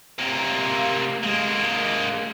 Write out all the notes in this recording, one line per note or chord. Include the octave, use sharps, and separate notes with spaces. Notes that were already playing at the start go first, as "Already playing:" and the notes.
C3 A#3
G#3 A#3